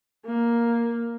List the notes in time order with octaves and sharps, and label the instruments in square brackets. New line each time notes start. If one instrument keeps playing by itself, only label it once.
[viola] A#3